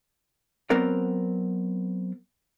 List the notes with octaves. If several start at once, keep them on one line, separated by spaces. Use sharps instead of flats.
F#3 B3 C4 A#4 D5